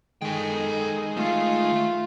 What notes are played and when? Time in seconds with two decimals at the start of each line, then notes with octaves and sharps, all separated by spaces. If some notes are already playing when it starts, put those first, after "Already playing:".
0.22 D#3 G#3 A4 G5
1.17 A3 F4